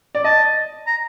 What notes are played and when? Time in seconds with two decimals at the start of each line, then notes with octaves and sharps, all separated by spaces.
0.15 D5
0.24 D#5 A5
0.87 A#5